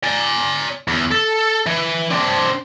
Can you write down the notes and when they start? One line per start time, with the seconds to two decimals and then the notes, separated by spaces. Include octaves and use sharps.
0.04 D5 G#5
0.88 E2
1.11 A4
1.66 E3
2.11 C4 D4